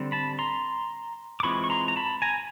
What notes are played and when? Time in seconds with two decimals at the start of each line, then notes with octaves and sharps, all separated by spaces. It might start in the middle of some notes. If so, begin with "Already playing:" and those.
Already playing: D3 G3 C4
0.12 A5 B5
0.39 A#5 C6
1.40 D6
1.43 E3 G#3 C4 F4 B5 C#6
1.64 C#6
1.70 A#5 C6
1.88 A#5
1.96 A5 B5
2.22 G#5 A#5